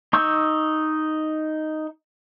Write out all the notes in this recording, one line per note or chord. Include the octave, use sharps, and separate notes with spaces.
D#4 C#6 E6 G6